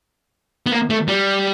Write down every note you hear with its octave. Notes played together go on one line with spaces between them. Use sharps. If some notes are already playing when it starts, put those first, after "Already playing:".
B3
A#3
A3
G3